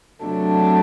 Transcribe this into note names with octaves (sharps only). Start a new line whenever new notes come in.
C3 F#3 A3 D4